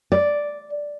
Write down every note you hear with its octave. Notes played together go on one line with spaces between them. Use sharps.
D5